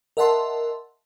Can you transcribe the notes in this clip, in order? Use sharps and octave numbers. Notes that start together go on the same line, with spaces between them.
A#4 D#5 E5 F#5 A5 C6